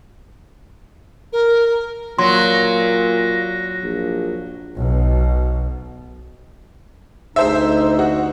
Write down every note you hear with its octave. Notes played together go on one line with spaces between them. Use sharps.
A#4
A#2 F#3 C6 A#6
A#1
B1 B2
D2 D#4 G#4 C5 E5
F#4